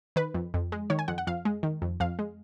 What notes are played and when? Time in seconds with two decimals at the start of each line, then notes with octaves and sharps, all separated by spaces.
0.16 D#3 B4
0.34 F2
0.54 F2
0.72 G#3
0.90 D#3 C#5
0.99 G#5
1.08 F2 F#5
1.18 F#5
1.27 F2 F5
1.45 G#3
1.63 D#3
1.82 F2
2.00 F2 F5
2.19 G#3